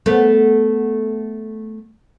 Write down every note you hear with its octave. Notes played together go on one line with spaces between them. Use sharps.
A3 B3